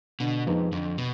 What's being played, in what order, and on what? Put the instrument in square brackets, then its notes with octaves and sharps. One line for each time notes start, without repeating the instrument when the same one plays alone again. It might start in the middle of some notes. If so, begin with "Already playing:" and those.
[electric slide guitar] B2 [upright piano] D3
[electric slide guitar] F2 [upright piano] F3 G#3 B3 D#4
[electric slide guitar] F2 [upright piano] D3
[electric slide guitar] B2